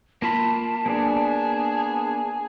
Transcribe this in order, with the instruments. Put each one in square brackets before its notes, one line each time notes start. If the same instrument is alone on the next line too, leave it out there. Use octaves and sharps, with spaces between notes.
[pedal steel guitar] A#3 F4 B5 [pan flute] A5
[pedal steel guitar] A#3 B3 D4 [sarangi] G#4